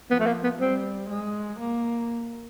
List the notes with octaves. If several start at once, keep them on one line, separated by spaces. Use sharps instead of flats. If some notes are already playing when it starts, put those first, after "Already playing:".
F3 B3
A3
A#3
B3
G3 C4
G#3
A#3